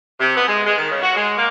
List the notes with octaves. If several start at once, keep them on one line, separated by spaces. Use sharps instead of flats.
C3
B3
G#3
G#3
D#3
C#3
F#4
G#3
A#3